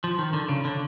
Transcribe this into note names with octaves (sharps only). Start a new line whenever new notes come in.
F3
D#3
D3
C#3
D3